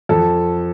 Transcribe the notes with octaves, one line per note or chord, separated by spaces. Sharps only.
F2 A4